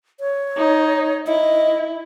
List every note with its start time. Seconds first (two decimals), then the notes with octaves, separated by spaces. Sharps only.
0.20 C#5
0.57 D#4
1.27 E4 D#5